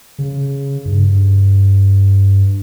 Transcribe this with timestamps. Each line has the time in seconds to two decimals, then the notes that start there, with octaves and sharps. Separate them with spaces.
0.19 C#3
0.85 G2